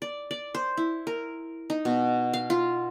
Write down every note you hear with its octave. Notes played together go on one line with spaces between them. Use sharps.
D5
D5
C5
E4
A#4
D#4
B2
F5
F4